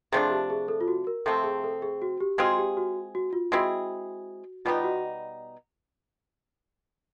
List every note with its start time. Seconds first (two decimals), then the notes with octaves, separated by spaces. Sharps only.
0.12 C3 F3 A3 D4 G#4
0.31 G4
0.50 G#4
0.68 A4
0.81 F4
0.88 F#4
1.07 A#4
1.26 C3 F3 A3 C4 A4
1.44 G#4
1.64 A4
1.82 G#4
2.02 F#4
2.20 G4
2.38 G#3 C4 F4 F#4 G#4
2.58 G4
2.77 F#4
3.15 F#4
3.33 F4
3.52 G#3 C4 E4 F#4 G#4
4.65 B2 G3 B3 D#4 F4
4.84 F#4